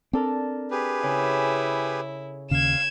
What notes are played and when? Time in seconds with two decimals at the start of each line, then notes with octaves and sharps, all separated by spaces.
0.13 C4 D4 A4 A#4
0.71 G4 G#4 B4
1.03 C#3 E4
2.51 D#2 C#3 F5 G#6 E7